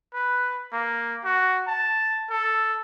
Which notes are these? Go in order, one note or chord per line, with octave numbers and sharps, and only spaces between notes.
B4
A#3
F#4
A5
A4